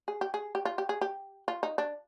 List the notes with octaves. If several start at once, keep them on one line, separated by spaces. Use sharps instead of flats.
G#4
G4
G#4
G4
F4
G4
G#4
G4
F4
D#4
D4